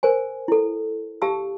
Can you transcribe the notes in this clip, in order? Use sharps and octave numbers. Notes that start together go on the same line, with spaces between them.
A#4 C5 G#5
E4 A4
G4 F5 A5 E6